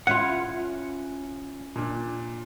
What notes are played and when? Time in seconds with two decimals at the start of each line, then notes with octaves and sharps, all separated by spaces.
0.07 C#4 E4 F4 F#5 C#7
1.76 A#2 D4